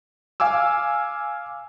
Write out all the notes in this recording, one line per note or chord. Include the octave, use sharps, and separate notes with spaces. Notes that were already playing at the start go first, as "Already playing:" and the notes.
F5 G#5 D6 E6